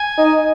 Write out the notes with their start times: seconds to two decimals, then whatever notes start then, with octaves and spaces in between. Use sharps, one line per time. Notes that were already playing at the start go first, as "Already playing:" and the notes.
Already playing: G#5
0.18 D#4